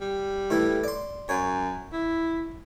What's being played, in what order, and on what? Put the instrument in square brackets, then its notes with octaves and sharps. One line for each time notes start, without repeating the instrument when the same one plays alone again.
[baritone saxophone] G3
[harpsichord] A2 E3 A4
D5 C6
[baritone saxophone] F#2 [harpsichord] C#5
[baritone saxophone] E4